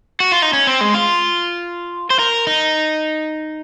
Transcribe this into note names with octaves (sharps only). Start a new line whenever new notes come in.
F#4
F4
D#4
C#4
C4
G#3
F4
C5
A#4
D#4